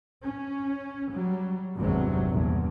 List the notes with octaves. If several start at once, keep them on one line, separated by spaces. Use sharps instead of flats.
C#4
F#3 G3
G#1 E2 G2 C3 F#3
A#1 E2 G2